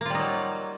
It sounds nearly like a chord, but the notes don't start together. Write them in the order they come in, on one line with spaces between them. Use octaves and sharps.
A#3 F4 G3 D#4 F#3